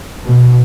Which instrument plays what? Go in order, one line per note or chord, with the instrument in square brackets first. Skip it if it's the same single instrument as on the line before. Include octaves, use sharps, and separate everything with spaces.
[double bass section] B2